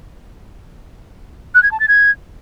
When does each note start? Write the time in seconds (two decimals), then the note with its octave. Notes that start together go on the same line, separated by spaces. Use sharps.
1.55 F#6
1.63 G#6
1.71 A5
1.80 A6
1.88 G#6